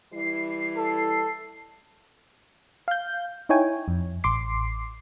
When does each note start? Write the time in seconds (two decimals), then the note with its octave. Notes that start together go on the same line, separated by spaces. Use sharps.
0.13 E3 G3 E4 C7
0.77 A4
2.88 F5 G6
3.49 D#4 E4 C#5 G5 G#5
3.88 F2
4.24 A1 C6 D6 C7